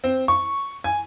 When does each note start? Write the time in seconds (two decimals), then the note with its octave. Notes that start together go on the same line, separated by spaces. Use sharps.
0.04 C4
0.28 C#6
0.84 G#5